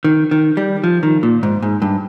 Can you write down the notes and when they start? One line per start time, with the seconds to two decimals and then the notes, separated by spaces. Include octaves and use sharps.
0.05 D#3
0.31 D#3
0.57 G3
0.84 F3
1.03 D#3
1.23 A#2
1.43 G#2
1.62 G#2
1.82 G2